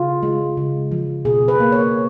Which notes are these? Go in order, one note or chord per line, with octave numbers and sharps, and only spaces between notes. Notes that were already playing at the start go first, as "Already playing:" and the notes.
Already playing: C#3 F4
G#3
C#3
F3
B2 G#4
B4
A#3
C#5